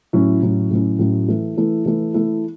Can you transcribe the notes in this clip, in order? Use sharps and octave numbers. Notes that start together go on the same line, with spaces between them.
A2 F#3 C#4 E4
A2 F#3 C#4 E4
A2 F#3 C#4 E4
A2 F#3 C#4 E4
E3 A3 E4
E3 A3 E4
E3 A3 E4
E3 A3 E4